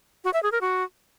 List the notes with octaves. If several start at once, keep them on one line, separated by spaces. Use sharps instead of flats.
F#4
E5
G#4
A#4
F#4